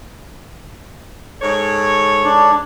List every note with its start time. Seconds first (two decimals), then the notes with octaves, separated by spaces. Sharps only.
1.42 G#2 A4 C#5
2.25 D4